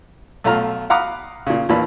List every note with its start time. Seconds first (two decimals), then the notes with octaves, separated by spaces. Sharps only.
0.44 B1 A3 F4 A#5 F6
0.90 F5 F#5 A#5 B5 D6 D#6
1.47 A#2 C#3
1.69 D#2 A#2 E3 D4 B5